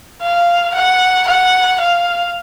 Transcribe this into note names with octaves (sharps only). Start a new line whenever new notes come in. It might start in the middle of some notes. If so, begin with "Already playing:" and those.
F5
F#5
F#5
F5